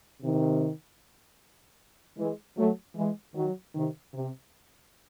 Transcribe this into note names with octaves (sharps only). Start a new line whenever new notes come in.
C3 D#3
E3 G#3
F#3 A3
E3 G#3
D#3 F#3
C3 D#3
C3